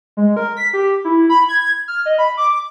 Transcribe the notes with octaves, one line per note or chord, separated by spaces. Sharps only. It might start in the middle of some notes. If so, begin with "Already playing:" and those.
G#3
A#4
B6
G4
E4
B5
G#6
F6
D#5
B5
D6